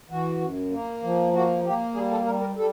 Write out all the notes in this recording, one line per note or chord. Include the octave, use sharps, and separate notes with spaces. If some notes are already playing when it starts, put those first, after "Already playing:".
E3 F#4
F#2
A#3
F3
A#3 F#4
A#3 G4
G3 G#4
A4
G3 A#4
A#4
G3 A4